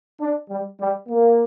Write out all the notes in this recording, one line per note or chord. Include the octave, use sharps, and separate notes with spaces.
D4
G3
G3
A#3